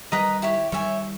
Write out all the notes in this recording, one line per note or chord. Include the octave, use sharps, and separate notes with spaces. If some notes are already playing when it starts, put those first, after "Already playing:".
D#3 G3 B4 D#5 A#5 D#6
E4 G4 C#5
D#3 G3 C#5 E5 G#5